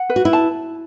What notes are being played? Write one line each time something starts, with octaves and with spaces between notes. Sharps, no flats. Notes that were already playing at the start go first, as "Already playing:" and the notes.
Already playing: F#5
B4
F#4
E4
A5